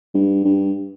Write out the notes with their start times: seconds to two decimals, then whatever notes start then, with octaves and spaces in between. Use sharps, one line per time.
0.14 G2
0.45 G2